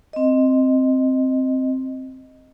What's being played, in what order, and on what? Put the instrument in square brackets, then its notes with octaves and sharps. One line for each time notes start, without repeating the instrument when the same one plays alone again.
[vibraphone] C4 D#5